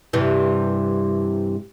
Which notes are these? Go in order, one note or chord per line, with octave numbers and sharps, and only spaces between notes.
G2 C3 E3